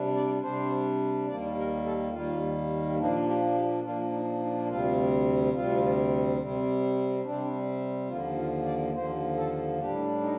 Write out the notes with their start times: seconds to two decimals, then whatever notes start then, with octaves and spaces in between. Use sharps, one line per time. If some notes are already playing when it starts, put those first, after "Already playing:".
Already playing: C3 G3 D4
0.14 D5
0.42 C3 G3 D4 C5
1.28 D#2 D#3 G3 A#3 D5
1.56 A#4
1.84 A4
2.13 D#2 D#3 G3 A#3 F4
2.98 A#2 F3 A#3 D4 D#4
3.26 G4
3.55 G4
3.83 A#2 F3 A#3 D4 F4
4.11 D#4
4.40 D#4
4.68 D2 C3 G3 C4 F4
5.53 D2 C3 G3 C4 F4
6.38 C3 G3 C4
7.23 C3 G3 C4 D4
8.08 D#2 D3 F3 A#3 F4
8.37 F4
8.65 D5
8.94 D#2 D3 F3 A#3 C5
9.36 A4
9.79 A2 G3 D4 G4
10.21 D#4